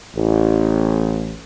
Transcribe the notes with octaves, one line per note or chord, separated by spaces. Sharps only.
A1